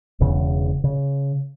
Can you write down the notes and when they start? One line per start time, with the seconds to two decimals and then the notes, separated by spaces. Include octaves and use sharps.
0.20 E1 E2 C#3
0.84 C#3